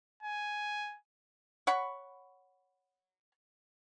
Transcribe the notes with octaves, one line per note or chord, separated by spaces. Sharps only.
G#5
C#5 F#5 B5 C#6